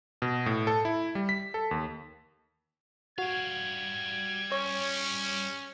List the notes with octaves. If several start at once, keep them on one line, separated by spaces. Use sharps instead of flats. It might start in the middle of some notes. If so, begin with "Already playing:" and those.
B2
A2
A4
E4
G3
B6
A4
D#2
G3 F#4 F5 G#6
C#4 C#5